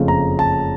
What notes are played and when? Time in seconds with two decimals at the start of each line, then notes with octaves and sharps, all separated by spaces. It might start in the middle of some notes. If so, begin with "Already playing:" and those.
Already playing: F#1 F2 C#3 F3 A3
0.08 A#5
0.39 A5